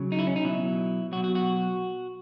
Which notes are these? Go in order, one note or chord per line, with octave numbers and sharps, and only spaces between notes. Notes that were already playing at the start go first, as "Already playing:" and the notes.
Already playing: C#3 F#3
D#4
E4
C#4
D#4
B2 F#3 E4
B2 F#3 F#4
F#4
F#4